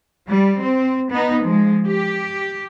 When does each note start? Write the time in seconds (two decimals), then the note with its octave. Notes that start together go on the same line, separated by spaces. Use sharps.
0.29 G3
0.62 C4
1.11 B3 D#4
1.42 F3 G#3
1.87 G4